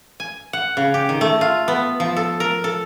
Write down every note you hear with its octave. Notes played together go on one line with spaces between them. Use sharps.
G#5
F#5
C#3
G4
D#3
A3
F4
B3
F3
A4
A#4
A4